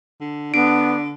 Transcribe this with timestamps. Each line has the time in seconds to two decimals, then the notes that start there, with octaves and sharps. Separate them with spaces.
0.21 D3
0.54 D3 B3 D4 D7